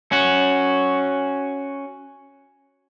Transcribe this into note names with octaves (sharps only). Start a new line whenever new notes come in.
C#4 F#4